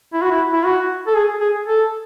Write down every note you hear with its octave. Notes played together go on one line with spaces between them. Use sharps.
E4
F#4
E4
E4
F#4
A4
G#4
G#4
A4